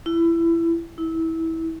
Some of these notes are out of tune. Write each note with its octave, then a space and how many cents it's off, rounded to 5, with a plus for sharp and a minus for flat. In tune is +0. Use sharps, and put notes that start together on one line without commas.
E4 +20
E4 -20